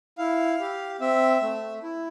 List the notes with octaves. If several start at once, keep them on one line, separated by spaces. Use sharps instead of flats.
E4 F5
G4
C4 E5
A3
E4